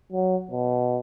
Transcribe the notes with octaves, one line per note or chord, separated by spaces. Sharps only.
F#3
B2